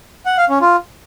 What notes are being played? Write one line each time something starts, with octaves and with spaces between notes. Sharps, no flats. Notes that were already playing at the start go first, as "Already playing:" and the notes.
F#5
F5
C#4
F4